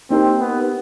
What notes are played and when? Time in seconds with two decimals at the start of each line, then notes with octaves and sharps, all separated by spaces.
0.11 A#3 C4 D#4 G4 A#4
0.40 B3